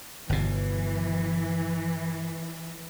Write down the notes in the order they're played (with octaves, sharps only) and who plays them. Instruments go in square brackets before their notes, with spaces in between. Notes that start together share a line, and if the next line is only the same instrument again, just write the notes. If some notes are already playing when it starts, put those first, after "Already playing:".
[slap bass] G1 B2 [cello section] E3